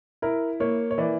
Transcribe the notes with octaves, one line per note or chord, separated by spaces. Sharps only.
E4 A#4
A#3 C#5
C#5
E3 D5